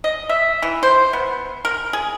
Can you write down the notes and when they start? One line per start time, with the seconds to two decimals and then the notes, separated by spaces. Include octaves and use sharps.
0.04 D#5
0.29 E5
0.62 E3
0.83 C5
1.13 B3
1.65 A#4
1.93 G#4